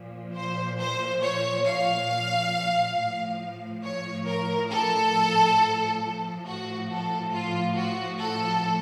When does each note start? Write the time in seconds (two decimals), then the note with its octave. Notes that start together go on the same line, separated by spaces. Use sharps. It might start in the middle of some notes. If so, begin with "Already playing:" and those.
Already playing: A#2 F3
0.35 C5
0.79 C5
1.22 C#5
1.66 F5
2.96 A2 F3
3.83 C#5
4.27 A#4
4.70 A4
6.45 A2 F3 F#4
6.89 A4
7.32 F4
7.75 F#4
8.19 A4